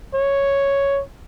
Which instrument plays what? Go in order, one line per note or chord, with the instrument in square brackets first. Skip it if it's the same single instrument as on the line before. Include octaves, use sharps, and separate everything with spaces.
[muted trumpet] C#5